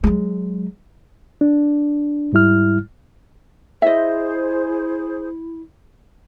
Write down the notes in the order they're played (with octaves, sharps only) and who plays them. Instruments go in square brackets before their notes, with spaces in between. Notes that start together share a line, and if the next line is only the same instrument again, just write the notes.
[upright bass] F#3 G#3
[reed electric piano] D4
G#2 G3 E4 F6
[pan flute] E4 [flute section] G#4 C5 [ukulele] D#5 E5